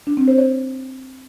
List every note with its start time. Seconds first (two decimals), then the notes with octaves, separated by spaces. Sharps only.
0.07 D4
0.17 C4
0.28 C5
0.38 C#5